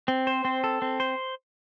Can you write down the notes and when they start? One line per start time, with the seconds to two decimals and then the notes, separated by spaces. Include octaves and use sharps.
0.08 C4
0.27 C5
0.45 C4
0.64 A4
0.82 C4
1.00 C5